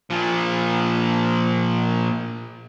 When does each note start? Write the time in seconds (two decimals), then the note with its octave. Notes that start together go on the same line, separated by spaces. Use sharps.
0.10 A#2 F3